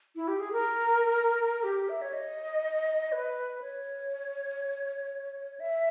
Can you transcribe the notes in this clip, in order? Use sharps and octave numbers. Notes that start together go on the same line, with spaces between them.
E4
G4
G#4
A#4
G4
E5
C#5
D#5
B4
C#5
E5